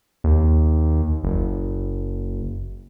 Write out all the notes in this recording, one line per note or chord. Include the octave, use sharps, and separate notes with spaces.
D#2
F#1